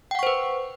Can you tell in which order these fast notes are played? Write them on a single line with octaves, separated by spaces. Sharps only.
G5 F#5 C#6 C5 B4